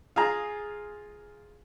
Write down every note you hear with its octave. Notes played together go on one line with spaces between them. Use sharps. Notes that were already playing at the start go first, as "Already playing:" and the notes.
F4 G#4 A#5